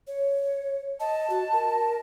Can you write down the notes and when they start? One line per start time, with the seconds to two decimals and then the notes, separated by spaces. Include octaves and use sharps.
0.07 C#5
1.00 D#5 A5
1.30 F#4
1.53 A#4